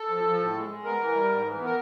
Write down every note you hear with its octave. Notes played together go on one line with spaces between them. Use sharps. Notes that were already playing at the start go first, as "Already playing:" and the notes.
Already playing: A4
F3
F3
A2
G#3
G#3
B3 A#4
E3
G3
G#2
E3
B3 A#4